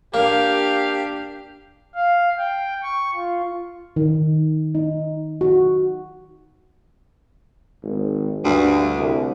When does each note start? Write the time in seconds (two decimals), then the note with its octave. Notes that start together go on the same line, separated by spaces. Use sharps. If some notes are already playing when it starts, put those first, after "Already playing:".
0.14 A#3 D4 G4 F5
1.95 F5
2.38 G5
2.83 C#6
3.14 F4
3.96 D#3
4.75 D#4
5.41 F#4
7.83 G#1
8.44 D2 G2
8.98 C2